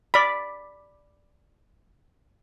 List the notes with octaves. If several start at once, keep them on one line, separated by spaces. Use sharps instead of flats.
D5 B5